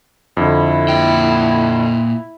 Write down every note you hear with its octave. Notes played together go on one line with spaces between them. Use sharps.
F2 D3 E4
A#2 G5